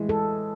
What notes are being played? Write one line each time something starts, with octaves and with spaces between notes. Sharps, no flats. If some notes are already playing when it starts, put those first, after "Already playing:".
Already playing: A2 E3 G#3
A4